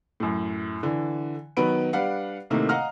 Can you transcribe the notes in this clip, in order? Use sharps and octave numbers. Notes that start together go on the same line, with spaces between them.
F#2 A2
D3 E3
D#3 F#3 B3 B4 B5 D7
G3 D4 B4 F5 F#5
A2 C3 D#3 A3 A#3
D#5 F5 F#5 A#5 F6